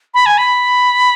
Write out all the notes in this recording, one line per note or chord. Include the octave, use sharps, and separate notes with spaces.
B5
G#5
B5